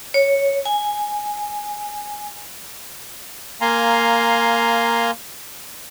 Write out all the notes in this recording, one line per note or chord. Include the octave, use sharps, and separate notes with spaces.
C#5
G#5
A#3 F5 G#5 A#5 C6